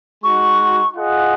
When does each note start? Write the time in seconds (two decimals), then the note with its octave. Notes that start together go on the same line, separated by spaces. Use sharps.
0.23 G#3 D#4 F#4 C#6
0.95 F4 G#4 D#5 F#5